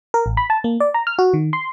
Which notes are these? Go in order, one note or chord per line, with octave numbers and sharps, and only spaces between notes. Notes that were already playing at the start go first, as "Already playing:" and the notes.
A#4
A1
B5
A5
A#3
D5
A#5
F6
F#4
D#3
C6